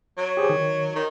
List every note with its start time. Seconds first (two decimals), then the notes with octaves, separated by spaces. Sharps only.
0.17 F#3
0.37 G4 G#4 C5
0.50 D#3
0.95 D#3